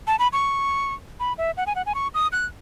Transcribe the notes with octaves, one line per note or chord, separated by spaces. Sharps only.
A5
B5
C#6
B5
E5
F#5
G#5
F#5
G#5
C#6
D#6
F#6